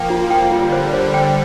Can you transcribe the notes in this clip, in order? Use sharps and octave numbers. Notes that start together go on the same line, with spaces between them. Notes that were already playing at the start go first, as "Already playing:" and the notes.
Already playing: F3 A#3 G5
F4
D3 G3 G5
F4
D3 G3 C5
C5
D3 G3 G5